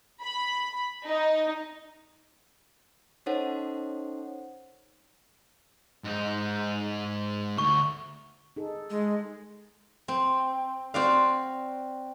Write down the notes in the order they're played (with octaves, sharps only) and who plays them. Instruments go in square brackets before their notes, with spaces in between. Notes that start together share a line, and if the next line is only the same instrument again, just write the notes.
[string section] B5
D#4
[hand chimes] C#4 D#4 A4 C5 C#5 F#5
[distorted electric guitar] G#2 D#4
[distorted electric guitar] D2 [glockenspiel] C#6
[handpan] D#4 G#4 A4
[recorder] G#3
[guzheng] C4
C4 F#4 D5 F5